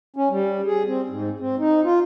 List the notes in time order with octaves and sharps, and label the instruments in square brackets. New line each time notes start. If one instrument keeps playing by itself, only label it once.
[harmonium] C#4
G3
G#4
C4
G#2
C4
D#4
F4